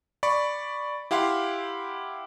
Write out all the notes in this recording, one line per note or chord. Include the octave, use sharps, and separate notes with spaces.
D5 B5 C#6
E4 G4 F5 F#5 C6